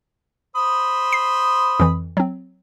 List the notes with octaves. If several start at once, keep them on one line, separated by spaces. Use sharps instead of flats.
C5 B5 D#6
C7
F2 E3
F#3 C4